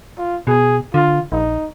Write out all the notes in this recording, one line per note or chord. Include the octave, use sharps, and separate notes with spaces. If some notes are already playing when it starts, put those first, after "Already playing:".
F4
B2 G#4
D3 F4
A#1 D#4